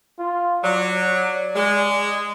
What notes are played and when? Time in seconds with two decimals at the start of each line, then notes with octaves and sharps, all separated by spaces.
0.19 F4
0.64 F#3 D5
1.55 G#3